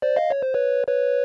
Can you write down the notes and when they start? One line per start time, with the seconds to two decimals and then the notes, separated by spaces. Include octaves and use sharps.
0.02 C5 D5
0.16 D#5 F5
0.31 C#5
0.43 C5
0.54 B4 C#5
0.87 B4 C#5